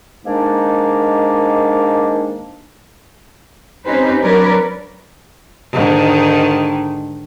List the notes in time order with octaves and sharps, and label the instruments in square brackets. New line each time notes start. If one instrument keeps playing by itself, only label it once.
[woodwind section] G#2 D#3 G#3 A#3 D4 D#4
[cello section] C4 C#4 D#4 G4 B4 C5
F#3 D4 A#4 B4 C#5 D5
[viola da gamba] G#2 D3 D#3